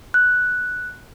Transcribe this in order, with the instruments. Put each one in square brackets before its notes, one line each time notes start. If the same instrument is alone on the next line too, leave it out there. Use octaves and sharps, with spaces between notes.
[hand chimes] F#6